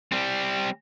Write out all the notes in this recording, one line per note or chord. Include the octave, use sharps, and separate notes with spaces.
G3 C4